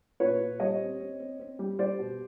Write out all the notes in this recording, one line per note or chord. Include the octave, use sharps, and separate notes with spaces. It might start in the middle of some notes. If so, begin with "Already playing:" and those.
A#2 B4 C#5
A#2
G3 C#5 D#5
C4
C4
C4
C4
G3
G3 C5 D5
B2